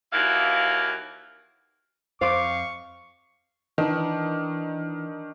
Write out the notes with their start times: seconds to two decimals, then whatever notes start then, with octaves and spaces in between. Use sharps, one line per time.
0.13 D#2 E3 A#3 E4 F#4 F5
2.21 F2 C5 F5 C#6 D6
3.78 D#3 E3 D4